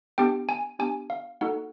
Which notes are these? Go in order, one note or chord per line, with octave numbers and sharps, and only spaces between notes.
B3 D4 G4 G5
G#5
B3 D4 G4 G#5
F5
A#3 D#4 F#4 A4 F#5